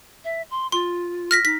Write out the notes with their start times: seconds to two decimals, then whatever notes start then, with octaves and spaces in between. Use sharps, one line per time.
0.24 E5
0.51 C6
0.72 F4 C6
1.31 F6 A#6 B6
1.45 D#4 B6